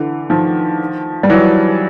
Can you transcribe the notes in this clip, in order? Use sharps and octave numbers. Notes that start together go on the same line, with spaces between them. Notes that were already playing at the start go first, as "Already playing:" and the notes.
Already playing: D3 E3
D#3 F3
G3
E3 F#3